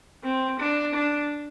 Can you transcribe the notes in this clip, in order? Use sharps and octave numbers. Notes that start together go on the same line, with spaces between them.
C4
D4
D4